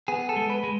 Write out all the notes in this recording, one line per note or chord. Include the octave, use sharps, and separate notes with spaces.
B3 G#4
A4
G#3
B4
G#3